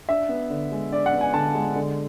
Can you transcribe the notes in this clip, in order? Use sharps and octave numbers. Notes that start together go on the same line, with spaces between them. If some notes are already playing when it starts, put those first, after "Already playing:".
D4 E5
B3
D3
G#3
D4 D5
F#5
B3
G#5
D3 A5
G#3
D3